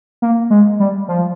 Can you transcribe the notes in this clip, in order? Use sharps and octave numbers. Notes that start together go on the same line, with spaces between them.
A#3
G#3
G3
F3